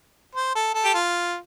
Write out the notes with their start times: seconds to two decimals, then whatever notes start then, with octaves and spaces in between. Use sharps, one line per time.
0.35 C5
0.55 A4
0.74 A4
0.85 G4
0.94 F4